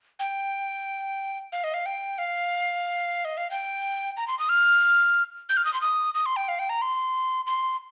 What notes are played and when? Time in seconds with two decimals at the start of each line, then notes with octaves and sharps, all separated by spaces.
0.19 G5
1.52 F5
1.64 D#5
1.74 F5
1.86 G5
2.18 F5
3.25 D#5
3.37 F5
3.51 G5
4.17 A#5
4.28 C6
4.39 D#6
4.49 F6
5.49 G6
5.57 F6
5.65 D#6
5.74 C6
5.81 D#6
6.14 D#6
6.26 C6
6.36 G5
6.49 F5
6.59 G5
6.69 A#5
6.82 C6
7.47 C6